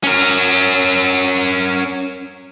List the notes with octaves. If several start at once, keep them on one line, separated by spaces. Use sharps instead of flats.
C#4 A#4